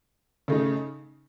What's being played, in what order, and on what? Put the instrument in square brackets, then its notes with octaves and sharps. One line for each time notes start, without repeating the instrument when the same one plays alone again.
[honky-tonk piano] C#3 A3 D#4